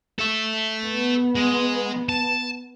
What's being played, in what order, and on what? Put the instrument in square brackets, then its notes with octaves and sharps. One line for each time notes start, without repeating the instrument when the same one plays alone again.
[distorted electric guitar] A4 E5
[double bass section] B3
[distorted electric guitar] G#3
A5